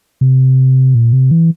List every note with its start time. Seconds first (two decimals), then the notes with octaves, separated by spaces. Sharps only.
0.21 C3
0.95 A#2
1.13 C3
1.31 E3